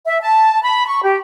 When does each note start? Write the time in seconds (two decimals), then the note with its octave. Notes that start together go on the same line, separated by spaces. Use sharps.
0.07 E5
0.21 A5
0.62 B5
0.87 C#6
1.04 G4